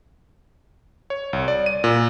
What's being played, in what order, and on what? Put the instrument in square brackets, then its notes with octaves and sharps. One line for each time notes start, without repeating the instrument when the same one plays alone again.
[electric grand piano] C#5
C2
D5
D#7
A#2